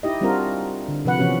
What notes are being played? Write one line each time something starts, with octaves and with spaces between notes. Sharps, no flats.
D#4 E4 G4 D#5
G3 C4 D4 F4 F#4 A#4
D3
C3 F3 B4 F#5
C3 E3 F3 B3 C#4 F#4